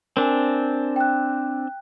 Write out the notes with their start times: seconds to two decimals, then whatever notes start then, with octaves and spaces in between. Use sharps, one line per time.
0.17 C4 D4 A#4 G#5
0.96 G5 F#6